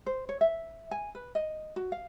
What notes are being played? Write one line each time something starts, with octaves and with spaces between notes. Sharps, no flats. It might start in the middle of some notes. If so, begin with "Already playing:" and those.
C5
C#5
E5
G#5
B4
D#5
F#4
F5